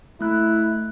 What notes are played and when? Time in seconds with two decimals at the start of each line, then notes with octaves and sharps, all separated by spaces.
0.21 A3 E4 F#6